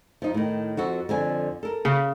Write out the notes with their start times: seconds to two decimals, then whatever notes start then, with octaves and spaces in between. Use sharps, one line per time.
0.22 F3 D#4
0.34 A2 D#3
0.77 F2 F#4 A4
1.09 F2 D3 G#5
1.63 A4 A#4
1.85 C#3